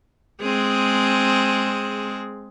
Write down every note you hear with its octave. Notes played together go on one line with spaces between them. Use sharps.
G#3 C4 G#4